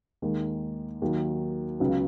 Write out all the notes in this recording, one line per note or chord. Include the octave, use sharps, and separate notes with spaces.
D#2 D#3 G#3
D#2 D#3 F#3
C#2 C#3 F#3 B3